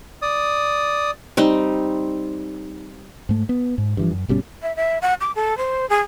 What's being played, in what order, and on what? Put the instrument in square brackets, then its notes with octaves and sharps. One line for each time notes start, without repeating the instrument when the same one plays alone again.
[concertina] D5 D#6
[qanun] G3 C4 D#4
[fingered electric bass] G#2 A3
B3
G#2
G2 E3 F3
F#2
G1 B2 G3 C#4
[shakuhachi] E5
E5
F#5
D6
A4
C5
G#4